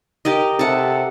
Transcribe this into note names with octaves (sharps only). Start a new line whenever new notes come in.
G4 A#4 D#5
C3 A4 F#5